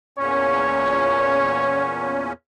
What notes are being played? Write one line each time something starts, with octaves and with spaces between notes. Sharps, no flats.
E2 A#2 C#4 C#5